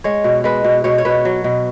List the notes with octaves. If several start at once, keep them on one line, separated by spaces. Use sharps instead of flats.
G#3 C#5
B2
G#3 B4
B2
B2 C#5
C#5
B2 B4
F#3
B2